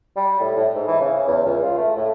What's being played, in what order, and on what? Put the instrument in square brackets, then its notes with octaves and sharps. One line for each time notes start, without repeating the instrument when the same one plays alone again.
[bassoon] G3
A2
A2
G#2
E3
C#3
E2
C#2
F4
A3
A2